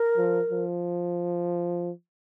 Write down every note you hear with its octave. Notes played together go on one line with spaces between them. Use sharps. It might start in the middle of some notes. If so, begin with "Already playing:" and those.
Already playing: A#4
F3
F3